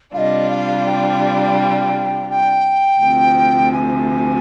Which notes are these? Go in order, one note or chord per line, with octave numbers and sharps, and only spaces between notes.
C3 G3 D4 F4 D#5 F5
F5
G5
G5
D2 C3 F3
G#5